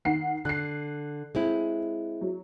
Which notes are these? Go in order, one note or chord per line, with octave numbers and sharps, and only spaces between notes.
D#3 F#5 C7
D3 F#6 C7
G#3 C4 E4
F#3